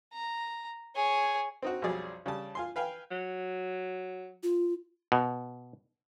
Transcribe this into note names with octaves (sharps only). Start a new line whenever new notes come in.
A#5
G#4 C#5
C4 D#4 F#4
B1 F2 F#3 G3 G#4 D5
C#3 G3 A5
F4 G#5 C6
B4 F5 G5 G#5
F#3
F4
B2